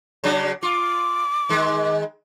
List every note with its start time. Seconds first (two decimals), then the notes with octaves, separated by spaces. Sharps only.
0.24 C#3 F#3 D4
0.63 F4 D6
1.49 D#3 G#3